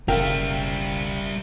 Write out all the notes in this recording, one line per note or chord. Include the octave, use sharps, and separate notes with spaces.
F#1 C#3 G3 A#4 E5 F5 G5